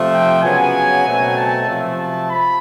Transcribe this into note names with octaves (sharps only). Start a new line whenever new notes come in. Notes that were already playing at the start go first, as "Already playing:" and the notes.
Already playing: C3 F3 A3
G5
C#3 F#3 B3 G#5
B2 F#3 A3 C4
A5
C3 F3 A3
A5
B5